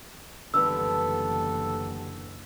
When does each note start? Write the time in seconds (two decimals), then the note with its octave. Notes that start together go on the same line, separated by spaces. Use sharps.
0.54 F#1 D3 E3 G3 B3 A4 E6